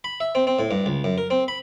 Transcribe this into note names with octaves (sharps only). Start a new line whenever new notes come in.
B5
E5
C4
C4
A2
G2
C#2
F#2
A#4
C4
B5